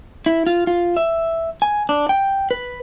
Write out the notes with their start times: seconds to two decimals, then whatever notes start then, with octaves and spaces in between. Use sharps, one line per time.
0.26 E4
0.47 F4
0.67 F4
0.97 E5
1.62 G#5
1.89 D4
2.09 G5
2.51 B4